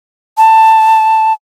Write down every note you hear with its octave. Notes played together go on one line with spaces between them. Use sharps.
A5